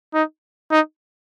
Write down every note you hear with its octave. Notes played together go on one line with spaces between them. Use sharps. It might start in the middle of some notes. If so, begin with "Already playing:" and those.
D#4
D#4